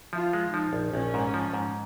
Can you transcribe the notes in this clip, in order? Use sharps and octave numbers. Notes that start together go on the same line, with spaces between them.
F3 F4
G#3
F3 D#4
A#1
A#1 C#4
G#2
F3
G#2